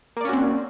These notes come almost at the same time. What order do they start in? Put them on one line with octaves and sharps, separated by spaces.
A#3 D5 C#4 F#4 C4